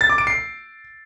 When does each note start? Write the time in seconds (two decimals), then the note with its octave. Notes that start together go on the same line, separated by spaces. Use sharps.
0.01 A6
0.09 D6
0.18 D7
0.27 C7